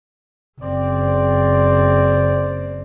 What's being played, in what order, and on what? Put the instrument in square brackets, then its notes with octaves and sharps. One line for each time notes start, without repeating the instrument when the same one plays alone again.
[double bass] F#1 [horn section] C4 D5